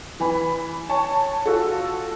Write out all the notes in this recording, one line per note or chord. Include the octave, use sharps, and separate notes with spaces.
E3 G#5 B5
C#5 G#5 A5 C#6
F4 F#4 A4